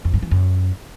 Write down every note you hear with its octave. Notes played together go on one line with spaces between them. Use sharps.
F2
G2
E3
F#2